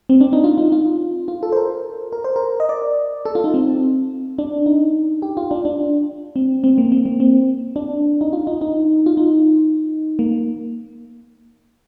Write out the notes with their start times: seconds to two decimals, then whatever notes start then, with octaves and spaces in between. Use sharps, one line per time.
0.09 C4
0.21 D4
0.33 D#4
0.44 F4
0.58 D#4
0.72 F4
1.28 F4
1.43 A4
1.52 C5
1.56 A#4
2.12 A#4
2.24 C5
2.36 A#4
2.60 D#5
2.69 D5
3.25 A4
3.35 F4
3.44 D#4
3.54 C4
4.38 D4
4.66 D#4
5.22 G4
5.37 F4
5.51 D4
5.65 D4
6.36 C4
6.64 C4
6.78 A#3
6.92 C4
7.06 A#3
7.20 C4
7.76 D4
8.21 D#4
8.33 F4
8.47 D#4
8.61 D#4
9.06 F4
9.17 D#4
10.19 A#3